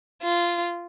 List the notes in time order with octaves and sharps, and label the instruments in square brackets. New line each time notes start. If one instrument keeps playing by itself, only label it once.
[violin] F4